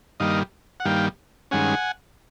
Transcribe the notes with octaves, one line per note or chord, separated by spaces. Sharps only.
G2 D#3 G3 A#3 D#5 F5
F#5
G2 D#3 G3 A#3 F5 G5
G2 D#3 G#3 C#4 F#5 G#5